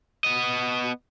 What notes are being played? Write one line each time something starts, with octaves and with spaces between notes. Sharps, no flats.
B3 D#5